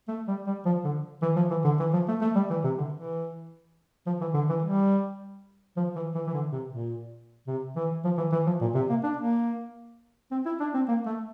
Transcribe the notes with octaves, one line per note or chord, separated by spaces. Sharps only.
A3
G3
G3
F3
D3
E3
F3
E3
D3
E3
F3
A3
A3
G3
E3
C3
D3
E3
F3
E3
D3
E3
G3
F3
E3
E3
E3
D3
C3
A#2
C3
E3
F3
E3
E3
F3
A#2
C3
A#3
D4
A#3
C4
E4
D4
C4
A#3
A3